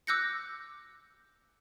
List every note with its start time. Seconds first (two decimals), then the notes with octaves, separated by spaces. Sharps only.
0.07 D6 E6 F#6 G6 A#6 C#7